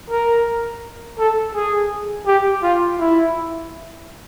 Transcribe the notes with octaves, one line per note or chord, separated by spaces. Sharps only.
A#4
A4
G#4
G4
F4
E4